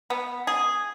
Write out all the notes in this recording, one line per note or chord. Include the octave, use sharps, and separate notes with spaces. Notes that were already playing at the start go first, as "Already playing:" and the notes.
B3
G#4